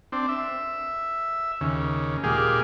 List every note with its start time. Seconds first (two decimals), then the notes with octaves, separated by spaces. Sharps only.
0.12 C4 D4
0.29 E5
1.61 D#2 C#3
2.23 A#2 G#3 G4 G#4 F5